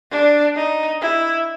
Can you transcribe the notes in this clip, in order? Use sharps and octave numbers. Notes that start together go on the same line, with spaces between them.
D4
D#4
E4